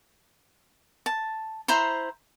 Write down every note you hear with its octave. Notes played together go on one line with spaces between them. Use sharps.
A5
E4 C5 A#5 C6